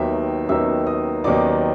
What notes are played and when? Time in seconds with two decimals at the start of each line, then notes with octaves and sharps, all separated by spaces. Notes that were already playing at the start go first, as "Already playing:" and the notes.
Already playing: D#2 D#3 F#3 B3 D#4 E5 E6
0.49 D#2 D#3 F#3 B3 D#4 E5 E6
0.87 D#5 D#6
1.24 D#2 D#3 F#3 B3 D#4 D5 D6